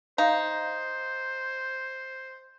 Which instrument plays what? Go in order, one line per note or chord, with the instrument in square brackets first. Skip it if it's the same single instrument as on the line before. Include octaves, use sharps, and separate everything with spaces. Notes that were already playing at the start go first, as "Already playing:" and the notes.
[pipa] D#4 [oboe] C5 [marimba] F5 A#5